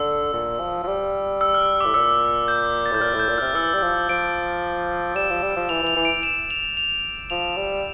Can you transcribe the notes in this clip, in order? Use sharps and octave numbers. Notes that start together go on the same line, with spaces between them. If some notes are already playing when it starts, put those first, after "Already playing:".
Already playing: D3 E6
A#2
F3
F3
G3
E6
F6
A2 D6
A#2 E6
G6
A6
A2 G6
A#2 F6
A2
G6
A#2
C3 F6
E3 E6
G3
F3
F3 D7
G3 E7
F3
G3
F3
E3 F7
E3 F7
E3
D7
E7
F7
F7
F3 F7
G3